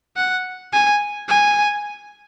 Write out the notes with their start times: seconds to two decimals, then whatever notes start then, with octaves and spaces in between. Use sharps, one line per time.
0.16 F#5
0.72 G#5
1.28 G#5